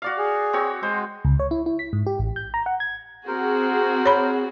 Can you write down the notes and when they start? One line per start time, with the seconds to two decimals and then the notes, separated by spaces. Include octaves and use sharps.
0.02 F#4 D5 F5
0.18 G#4
0.53 C4 F#4 C#5
0.83 G#3 C5
1.25 C#2
1.40 C#5
1.51 E4
1.66 E4
1.79 B6
1.93 G#2
2.06 G4
2.19 A1
2.36 G6
2.54 A#5
2.66 F#5
2.80 G#6
3.27 C4 F#4 G#4 A#4 C5
4.06 C#5 B5